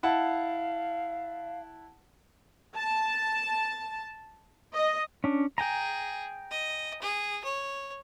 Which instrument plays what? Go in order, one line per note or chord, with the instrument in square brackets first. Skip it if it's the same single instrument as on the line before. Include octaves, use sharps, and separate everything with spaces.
[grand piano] E4 F#5 A5 [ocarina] F5
[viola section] A5
D#5
[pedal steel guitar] C#4 D4
[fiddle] G#4 [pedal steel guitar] G5 G#5 A#5
[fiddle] D#5
G#4
C#5